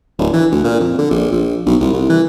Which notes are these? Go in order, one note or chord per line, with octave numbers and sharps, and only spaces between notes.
D1
E3
D2
A#2
F2
D3
A#1
A#1
B1
C2
C2
E3